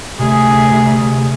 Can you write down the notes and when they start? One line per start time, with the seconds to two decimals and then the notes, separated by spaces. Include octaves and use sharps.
0.20 D2 C3 G#4
0.72 C3